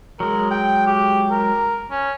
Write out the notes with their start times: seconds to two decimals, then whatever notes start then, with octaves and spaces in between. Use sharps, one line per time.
0.20 F#3 G#3 A#4
0.51 G5
0.87 G4
1.31 A#4
1.90 C#4